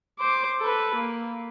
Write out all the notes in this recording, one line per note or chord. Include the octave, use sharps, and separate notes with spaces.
C5 D6
A4 B4
A#3